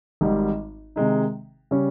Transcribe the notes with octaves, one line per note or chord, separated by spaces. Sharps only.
G#1 G#2 G3
C3 D#3 G#3 D#4
C#3 G3 C#4